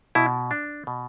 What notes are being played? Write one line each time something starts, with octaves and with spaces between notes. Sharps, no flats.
B2 E4
D4
B2